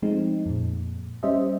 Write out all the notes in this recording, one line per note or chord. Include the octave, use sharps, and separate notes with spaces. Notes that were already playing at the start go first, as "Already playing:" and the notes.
F3 G#3 A3 C4 D#4
F2 A#2
G3 C#4 G4 C5 D#5 E5